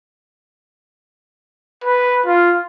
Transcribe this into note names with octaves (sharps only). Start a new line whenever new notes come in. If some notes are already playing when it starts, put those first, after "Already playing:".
B4
F4